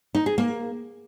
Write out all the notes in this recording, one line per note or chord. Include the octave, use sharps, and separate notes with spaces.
D#4
G#4
A#3